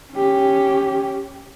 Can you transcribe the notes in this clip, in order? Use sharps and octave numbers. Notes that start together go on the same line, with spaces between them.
C#4 G4